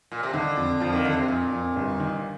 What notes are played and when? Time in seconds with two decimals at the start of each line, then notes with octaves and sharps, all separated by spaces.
0.12 A#2
0.23 C3
0.33 D3 D#3
0.57 F2
0.80 F2 F3
0.93 D#3
1.05 F2 D3
1.17 C3
1.28 F2 A#2
1.52 F2
1.77 G1
2.00 D#3